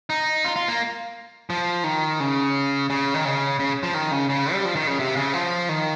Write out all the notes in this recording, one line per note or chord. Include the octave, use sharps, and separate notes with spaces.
D#4
F4
F4
A#3
F3
D#3
C#3
C#3
D#3
C#3
C#3
F3
D#3
C#3
C#3
G3
F3
D#3
C#3
C3
C#3
F3
D#3